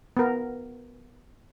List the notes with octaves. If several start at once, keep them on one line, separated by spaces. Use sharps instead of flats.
B3 A#4